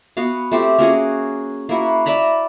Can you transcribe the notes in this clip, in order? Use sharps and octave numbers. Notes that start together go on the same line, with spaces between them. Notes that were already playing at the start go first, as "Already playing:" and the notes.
B3 F#4 F5
A3 C4 G4
A#3 C#4 F#4 G#4
A#3 E4 F#4
D5 E5 A#5 B5